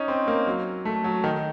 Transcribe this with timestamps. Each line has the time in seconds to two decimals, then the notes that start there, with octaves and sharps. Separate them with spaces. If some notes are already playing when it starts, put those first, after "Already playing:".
Already playing: C#4 D#4
0.08 C4
0.28 A#3
0.47 F#3
0.85 A3
1.04 F#3
1.24 D#3